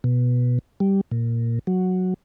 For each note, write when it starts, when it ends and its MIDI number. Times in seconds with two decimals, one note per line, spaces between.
0.04 0.59 47
0.80 1.01 55
1.12 1.59 46
1.67 2.14 54